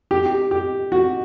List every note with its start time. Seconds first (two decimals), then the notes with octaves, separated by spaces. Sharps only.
0.11 G4
0.26 G4
0.51 G4
0.92 F#4